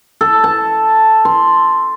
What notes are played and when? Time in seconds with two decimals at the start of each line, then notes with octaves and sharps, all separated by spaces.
0.21 A4
0.44 A5
1.25 C6